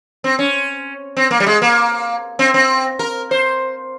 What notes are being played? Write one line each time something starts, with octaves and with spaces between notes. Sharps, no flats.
C4
C#4
C4
A#3
G3
G#3
A#3
C4
C4
A#4
C5